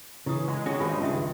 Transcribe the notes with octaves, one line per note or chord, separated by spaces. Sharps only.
C#3 E3 C#4 E4 D#6
G#3
D#3 C#4 E4 F#4 G#4 D#6
G2 G#3 C4 D#4 F4 G#5 B5
C#2 D#3 G#3 C#4 E5 D#6